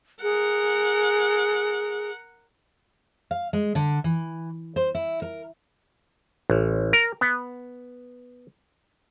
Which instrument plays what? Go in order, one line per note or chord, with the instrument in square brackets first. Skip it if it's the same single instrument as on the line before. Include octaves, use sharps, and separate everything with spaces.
[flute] G#4 [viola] A#4 F#5
[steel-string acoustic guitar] F5
G#3
D3
E3
C5
E4
A#4
[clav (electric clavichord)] A1
A#4
B3